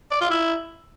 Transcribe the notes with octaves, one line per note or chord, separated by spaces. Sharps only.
D5
F4
E4